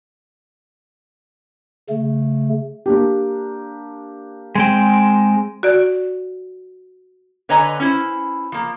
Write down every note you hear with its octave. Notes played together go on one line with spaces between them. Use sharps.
C#3 A3
A#3 D4 G4
G#3 C4 G5
F#4 D5
D3 B4 C#5 D#5 G#5 A#5
C#4 E4 C5
F3 A#3